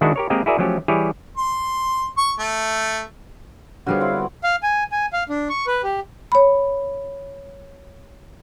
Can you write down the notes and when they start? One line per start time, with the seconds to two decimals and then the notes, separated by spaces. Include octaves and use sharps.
0.01 D#3 G#3 D4 E4 F#4 F#5
0.16 G4 A#4 C#5
0.30 G#3 A#3 C4 G4 A#4 D#5
0.46 E4 F#4 G#4 A#4 D5 E5
0.58 F3 F#3 A3 C#4 G4
0.88 E3 G3 E4 G4 G#4 C#5
1.37 C6
2.17 C#6
2.39 A3
3.87 G#2 D3 G3 B3 F#4 C#5 F5
4.00 E3 C4 F#5
4.44 F5
4.63 G#5
4.92 G#5
5.13 F5
5.29 D4
5.49 C#6
5.67 B4
5.84 G4
6.32 C#5 B5